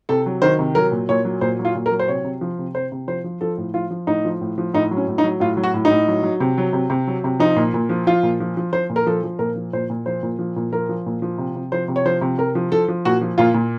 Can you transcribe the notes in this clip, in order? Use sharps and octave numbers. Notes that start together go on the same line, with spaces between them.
C3 A4
F#3
D#3 C5
C3
F#3 A#4
A#2
A#2 C#5
F#3
A#2 C5
F#3
F4
A#2
A#4
F#3
C5
C3 C#5
C3
F3
C3
C3 C5
C3
F3 C5
F3
F3 A4
A2
F3 F4
F3
A2 D#4
F3
A2
F3
A2 D#4
F#3
C#4
A2
D#4
F#3
A2 F4
F#3
F#4
A2
D#4
A2
F#3
F#3
C3
F#3
C3
C3
F#3
C3
F3 D#4
A#2
A#2
F3
F3 F4
A#2
F3
F3
F3 C5
A#2
A#4
F3 A4
F3
A#2 A#4
F3
A#2 C5
A#2
F3 C5
A#2
F3
A#2
F3 A#4
F3
A#2
F3
C3
C3
F3 C5
C3
C#5
F3 C5
C3
C3 A#4
F3
F3 A4
F3
A#2 F#4
F3
A#2 F4
A#2